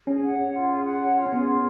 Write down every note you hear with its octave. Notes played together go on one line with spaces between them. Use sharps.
C#4 G#4
F#5
C#5
F4
G#4
F#5
C#5
F4
C#4
B3 G#4
F4